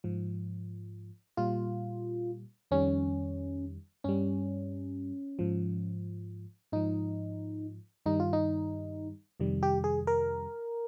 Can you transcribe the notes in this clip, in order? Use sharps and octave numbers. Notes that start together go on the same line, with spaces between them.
G#2 F3
A#2 G3 F4
F2 D#3 G3 C#4
G2 G3 C#4
G#2 F3
G#2 F3 D#4
G2 D#3 G3 D#4
F4
D#4
F2 C3 D#3 G3
G4
G#4
A#4